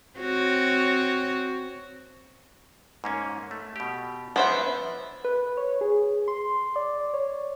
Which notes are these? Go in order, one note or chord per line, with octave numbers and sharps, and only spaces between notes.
C4 F#4 C#5
G#2 A#3 C#4
A3
B2 G4
F3 B3 C#4 D4 C5 E5
B4
C#5
G#4
C6
D5
C#5